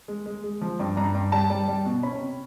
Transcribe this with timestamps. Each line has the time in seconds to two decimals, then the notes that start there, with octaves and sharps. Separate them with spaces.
0.08 G#3
0.26 G#3
0.44 G#3
0.61 F3
0.80 G2
0.97 G2 A#5
1.14 G2
1.32 G3 A5
1.50 G3
1.68 G3
1.85 B2
2.03 C#4 B5
2.21 C3